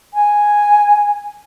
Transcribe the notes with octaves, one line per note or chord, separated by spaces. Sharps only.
G#5